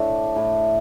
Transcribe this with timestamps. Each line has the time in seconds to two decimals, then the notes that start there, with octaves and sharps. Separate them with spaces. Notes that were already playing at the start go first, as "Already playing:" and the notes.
Already playing: A2 A3 D4 A4
0.36 A2 A3 E4 A4